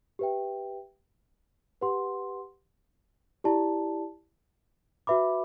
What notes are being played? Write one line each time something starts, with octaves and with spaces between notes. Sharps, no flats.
G4 B4 E5 G5
G4 B4 F#5 C6
E4 G4 D5 A5
F#4 B4 E5 B5 D6